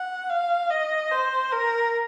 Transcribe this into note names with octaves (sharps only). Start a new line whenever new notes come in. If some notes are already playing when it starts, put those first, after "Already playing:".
Already playing: F#5
F5
D#5
C5
A#4